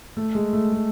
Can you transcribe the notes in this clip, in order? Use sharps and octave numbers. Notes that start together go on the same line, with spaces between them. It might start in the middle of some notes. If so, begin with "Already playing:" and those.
A3
G#3
A3
G#3